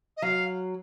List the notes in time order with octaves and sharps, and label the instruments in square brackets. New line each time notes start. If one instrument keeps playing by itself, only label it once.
[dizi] D#5
[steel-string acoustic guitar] F#3 [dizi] F5